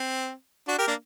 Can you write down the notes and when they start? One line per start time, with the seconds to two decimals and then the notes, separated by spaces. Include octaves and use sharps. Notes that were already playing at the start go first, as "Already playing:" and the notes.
Already playing: C4
0.68 D4 F#4
0.78 G4 A#4
0.87 A#3 D4